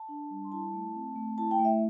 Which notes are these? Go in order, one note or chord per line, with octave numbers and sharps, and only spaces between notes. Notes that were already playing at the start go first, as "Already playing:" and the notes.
Already playing: A5
D4
G3
C6
E4 A5
A3
C4
A3
E4 A5
G5
A3
E5